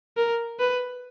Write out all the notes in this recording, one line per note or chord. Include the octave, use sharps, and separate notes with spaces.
A#4
B4